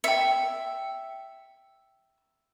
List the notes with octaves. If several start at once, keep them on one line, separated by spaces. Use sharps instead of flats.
E5 G5 C#7